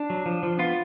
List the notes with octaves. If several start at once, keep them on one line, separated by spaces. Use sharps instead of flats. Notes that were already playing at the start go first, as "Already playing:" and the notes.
Already playing: D4
F#3
F3
F3
B3 F4